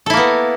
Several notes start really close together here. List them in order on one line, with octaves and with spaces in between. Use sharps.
A4 E4 A#3 B3